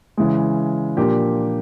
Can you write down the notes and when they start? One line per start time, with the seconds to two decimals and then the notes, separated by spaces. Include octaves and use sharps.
0.17 C#3 E3 G#3
0.97 A#2 F3 A#3 D4 G4